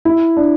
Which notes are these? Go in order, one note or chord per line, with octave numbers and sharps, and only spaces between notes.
E4
D4